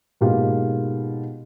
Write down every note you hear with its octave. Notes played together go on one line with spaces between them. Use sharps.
G#2 B2 A#3 F4 G4